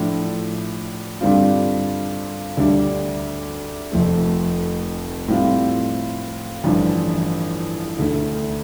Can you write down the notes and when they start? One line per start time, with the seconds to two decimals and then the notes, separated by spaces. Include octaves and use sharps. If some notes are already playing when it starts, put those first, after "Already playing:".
Already playing: A2 F3 D4
1.21 G2 D3 G3 C4 F4
2.57 D2 D3 G3 D4
3.92 F1 F2 F3 A3
5.28 A2 G3 C4 F4
6.64 A1 G2 D3 F3
7.99 D2 D3 A3